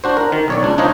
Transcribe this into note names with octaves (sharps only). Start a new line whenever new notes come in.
D4 F#4 C5
A#4
D#3
B1 C#5 D5
C#2 D4
D4 D#4 F4 C5 C#5 D#5